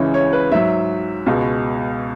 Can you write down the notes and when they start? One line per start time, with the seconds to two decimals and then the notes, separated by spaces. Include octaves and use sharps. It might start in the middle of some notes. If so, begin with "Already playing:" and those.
Already playing: C#2 C#3 E3 G#3 C#5
0.14 C#5
0.33 B4
0.52 G#2 F#3 E5
1.26 C#2 B2 G#3